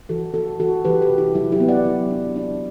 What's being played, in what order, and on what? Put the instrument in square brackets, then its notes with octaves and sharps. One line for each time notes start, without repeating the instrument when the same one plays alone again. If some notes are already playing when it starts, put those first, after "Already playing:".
[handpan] E3 F#4 A4
E3 F#4 A4
E3 F#4 A4
E3 G4 B4
G4 B4
C3
E4 G4
F#3 E4 G4
E4 G4
B3
D5 F#5
F#3
D4
D4